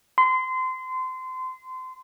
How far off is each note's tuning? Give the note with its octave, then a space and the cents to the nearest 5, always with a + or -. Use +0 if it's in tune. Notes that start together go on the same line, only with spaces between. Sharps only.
C6 -25